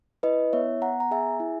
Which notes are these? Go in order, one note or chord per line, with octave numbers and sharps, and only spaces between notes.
E4 B4 D#5
B3 C#5 E5
B3 F#5 A#5
A#5
G#4 E5 G#5
E4